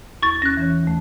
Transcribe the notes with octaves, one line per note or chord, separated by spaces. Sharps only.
E2 C#6 A6
C#4 F#6 A#6
E3 C#4 C#5
D#2 A3